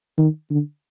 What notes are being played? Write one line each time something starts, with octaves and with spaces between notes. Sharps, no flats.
D#3
D3